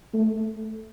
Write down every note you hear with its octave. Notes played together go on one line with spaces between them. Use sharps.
A3